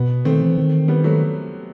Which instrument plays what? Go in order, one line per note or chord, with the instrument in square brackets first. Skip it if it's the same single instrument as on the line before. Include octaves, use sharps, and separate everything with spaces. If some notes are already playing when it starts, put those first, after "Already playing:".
Already playing: [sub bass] B2 [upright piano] B3
[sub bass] D#3 [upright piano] A3 C4
[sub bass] E3
D#3
[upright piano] G3 B3
F#3 A3